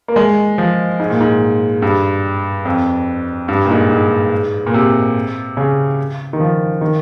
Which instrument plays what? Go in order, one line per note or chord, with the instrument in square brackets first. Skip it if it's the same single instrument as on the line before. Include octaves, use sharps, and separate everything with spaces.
[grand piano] A#3
G#3
F3
G#2
A#2
G#2
G2
F2
G2
A#2
G#2
G#2
A#2
C3
C#3
D#3
F3
D#3